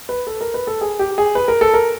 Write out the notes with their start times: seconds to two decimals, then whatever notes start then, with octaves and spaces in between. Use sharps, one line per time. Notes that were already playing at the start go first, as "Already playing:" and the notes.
0.09 B4
0.27 A4
0.41 A#4
0.54 B4
0.67 A4
0.81 G#4
0.99 G4
1.18 G#4
1.35 B4
1.48 A#4
1.61 A4
1.74 A#4